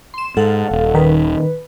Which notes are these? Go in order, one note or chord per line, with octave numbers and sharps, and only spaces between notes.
C6 E7
G#2 A4 F5 F#5
D#1
D#3 B4